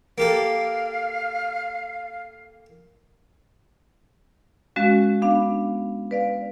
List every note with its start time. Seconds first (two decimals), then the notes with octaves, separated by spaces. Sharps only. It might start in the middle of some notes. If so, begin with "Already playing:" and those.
0.18 A#3 G4 A4 F5
4.76 G#3 C#4 F#4 F5
5.22 B3 D4 F5
6.11 B4 D5 F5